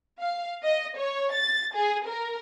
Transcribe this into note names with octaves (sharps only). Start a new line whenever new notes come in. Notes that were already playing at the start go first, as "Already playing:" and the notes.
F5
D#5
C#5
A6
G#4
A#4